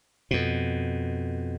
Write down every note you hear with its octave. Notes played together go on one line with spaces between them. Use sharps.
F2 B2